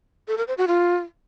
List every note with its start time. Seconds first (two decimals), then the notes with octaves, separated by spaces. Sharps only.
0.28 A4
0.38 A#4
0.48 C5
0.58 F#4
0.68 F4